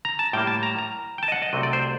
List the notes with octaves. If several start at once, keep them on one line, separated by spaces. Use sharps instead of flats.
A#5
A5
A2 G3 A#3 G5
A5
A#5
A#5
G5
A5
D#5
F#5
D#5
C2 C3 F#3 A3 C4 D#5
D5
C5